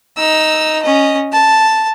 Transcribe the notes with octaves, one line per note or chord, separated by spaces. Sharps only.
D#4 E6
C#4 D#5
A5